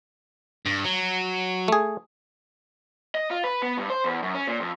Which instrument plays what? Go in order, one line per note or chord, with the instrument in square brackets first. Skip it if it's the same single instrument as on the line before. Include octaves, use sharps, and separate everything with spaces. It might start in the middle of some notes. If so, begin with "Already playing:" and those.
[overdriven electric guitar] G2
F#3
[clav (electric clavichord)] A3 G#4
[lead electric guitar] D#5
F4
B4
B3
G2
C5
E2
F#2
C#4
A#2
F2